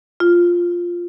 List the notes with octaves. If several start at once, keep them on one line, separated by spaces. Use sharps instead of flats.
F4